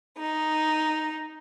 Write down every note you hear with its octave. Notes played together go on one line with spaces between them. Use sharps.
D#4